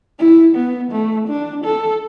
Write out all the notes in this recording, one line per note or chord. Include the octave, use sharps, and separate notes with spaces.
E4
B3
A3
D4
A4